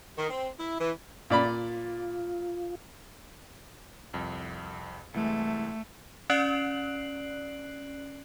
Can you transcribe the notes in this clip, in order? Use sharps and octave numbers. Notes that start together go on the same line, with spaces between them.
D#3
C4
E4
E3
A#2 F4 D5 B5
C2 F2
C2 E3 G#3 A3
C#4 D5 F#6 C7 D7 F#7